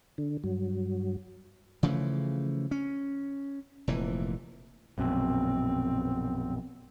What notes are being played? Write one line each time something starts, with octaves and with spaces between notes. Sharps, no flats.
D3
G2 F#3
C#3 E3 F3 A3
C#4
F1 A#2 E3
A#1 F#2 B2 C4